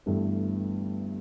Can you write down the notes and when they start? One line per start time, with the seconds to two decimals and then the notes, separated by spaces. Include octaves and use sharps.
0.06 G1 G2 E3 A3